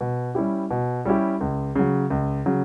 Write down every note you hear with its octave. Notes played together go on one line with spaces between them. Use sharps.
B2
G3 C#4 E4 G4
B2
G3 C#4 E4 G4
C#2
C#3 F#3
C#2
C#3 F#3